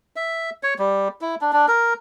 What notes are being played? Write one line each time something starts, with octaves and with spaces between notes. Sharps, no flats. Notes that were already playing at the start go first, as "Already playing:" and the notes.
E5
C#5
G3
E4
D4
D4
A#4